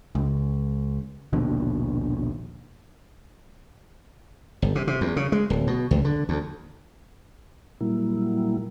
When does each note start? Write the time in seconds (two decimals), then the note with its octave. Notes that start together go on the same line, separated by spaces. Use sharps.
0.15 C#2
1.33 A#1 D#2 B2 D3
4.62 G1
4.75 C3
4.87 C3
5.01 E2
5.16 C#3
5.32 G#3
5.50 D1
5.67 B2
5.91 C#2
6.05 D3
6.29 D2
7.81 A#2 F#3 G3 A#3 E4